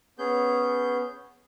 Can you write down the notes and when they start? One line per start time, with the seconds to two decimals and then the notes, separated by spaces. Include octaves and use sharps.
0.19 B3 C#4 G#4 G6